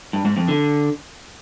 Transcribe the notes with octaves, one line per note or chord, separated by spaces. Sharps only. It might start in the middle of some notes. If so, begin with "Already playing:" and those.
G2
G#2
F2
D3